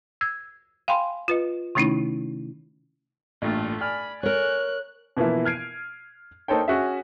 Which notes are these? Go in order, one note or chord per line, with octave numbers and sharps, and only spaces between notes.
E6 G#6
F5 G5 G#5 B5 C6
F4 B4 D#5
C3 D#3 A3 C#4 D#4 E4
A1 G2 A#2 A3 F4
D5 G#5 B5 F6
A#4 C#5 F#6
B2 E3 F3 A#3 E4
F6 G#6 C7 D7 D#7
A#3 D#4 A4 C5 C#5 G5
C#4 F#4 G#4 E5